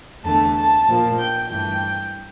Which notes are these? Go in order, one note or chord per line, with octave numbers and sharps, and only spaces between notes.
E2 D3 A3 A5
A5
A#2 F3 A#3
G5
G2 E3 A3 G5